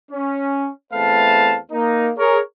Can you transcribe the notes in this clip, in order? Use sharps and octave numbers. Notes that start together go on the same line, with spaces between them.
C#4
E2 A3 C4 B4 F5 A5
A#3 D#4
G#4 A#4 C#5